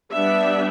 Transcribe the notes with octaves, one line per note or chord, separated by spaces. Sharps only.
G3 B3 D4 E5